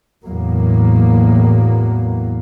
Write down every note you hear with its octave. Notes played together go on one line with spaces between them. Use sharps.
E2 A2 F#3 A#3